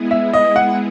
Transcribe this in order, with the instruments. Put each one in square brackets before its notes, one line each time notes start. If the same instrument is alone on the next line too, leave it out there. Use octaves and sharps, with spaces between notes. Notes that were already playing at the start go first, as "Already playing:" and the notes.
Already playing: [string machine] G#3 B3 E4 G#4
[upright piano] E5
D#5
F#5